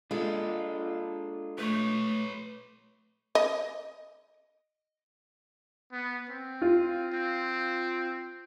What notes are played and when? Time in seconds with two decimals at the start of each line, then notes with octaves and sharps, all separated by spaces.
0.11 G#3 D4 F4 A4
1.59 A3 B4 C#5
3.35 D#5
5.92 B3
6.29 C4
6.62 F4
7.12 C4